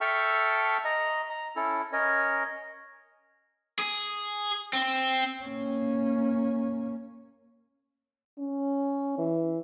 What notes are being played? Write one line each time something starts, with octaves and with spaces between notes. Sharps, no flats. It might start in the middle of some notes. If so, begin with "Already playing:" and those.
A4 E5 G5 A5 C#6 F6
D#5 A#5
A#5
C#4 E4 A4
C#4 A#4 C#5 D#5
G#4
C4
A#3 C#4
C#4
E3